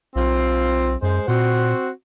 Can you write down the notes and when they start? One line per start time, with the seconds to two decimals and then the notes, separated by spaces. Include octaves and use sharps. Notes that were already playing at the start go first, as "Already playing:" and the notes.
0.15 B1 C4 F4
1.02 F#2 G#3 C5
1.28 A#2 C4 F#4